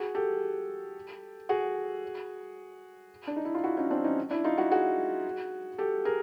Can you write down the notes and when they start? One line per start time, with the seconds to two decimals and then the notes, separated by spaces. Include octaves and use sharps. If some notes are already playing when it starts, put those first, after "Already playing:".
Already playing: F#4 G#4
0.15 G4 A4
1.49 F#4 G#4
3.27 D4
3.36 D#4
3.45 E4
3.55 F4
3.64 E4 F#4
3.77 C#4 D#4
3.90 C4 D4
4.04 C#4 D#4
4.31 D4 E4
4.44 D#4 F4
4.57 E4 F#4
4.71 F#4 G#4
5.78 G4 A4
6.05 G#4 A#4